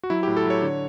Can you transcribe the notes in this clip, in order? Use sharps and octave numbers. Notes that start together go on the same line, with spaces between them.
F#4
F#3 E4
G4
A2
A4
F#3 C#5
D3